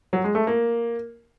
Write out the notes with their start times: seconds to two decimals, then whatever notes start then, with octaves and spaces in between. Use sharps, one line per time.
0.13 F#3
0.24 G#3
0.35 A3
0.47 A#3